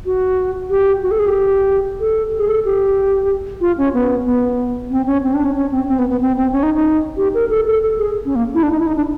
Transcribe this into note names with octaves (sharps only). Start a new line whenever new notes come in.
F#4
G4
F#4
A4
G#4
G4
A4
G#4
A4
G4
F4
C#4
B3
B3
C4
C#4
C4
D4
C#4
C#4
C4
C4
B3
B3
C4
C4
C#4
D#4
D#4
G4
A#4
A4
A4
A4
G#4
C#4
A#3
E4
D4
D#4
E4
D#4
D4